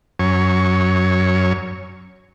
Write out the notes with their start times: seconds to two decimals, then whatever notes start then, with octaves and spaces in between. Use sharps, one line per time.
0.19 F#2 C#5